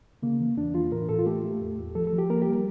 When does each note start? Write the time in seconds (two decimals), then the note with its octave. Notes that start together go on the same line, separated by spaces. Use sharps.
0.23 C#3 A#3
0.41 E3
0.57 E2 D4
0.74 E3 F4
0.92 A2 A#4
1.09 A2 A4
1.19 F4
1.26 A3 G4
1.44 A3
1.61 E2
1.78 E2
1.95 F3 A4
2.07 A4
2.13 F3
2.18 G4
2.30 A#3 A#4
2.42 G4
2.47 G3